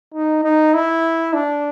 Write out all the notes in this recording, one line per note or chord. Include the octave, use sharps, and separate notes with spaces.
D#4
D#4
E4
D4